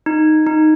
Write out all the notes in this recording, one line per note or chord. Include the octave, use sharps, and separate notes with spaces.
D#4
D#4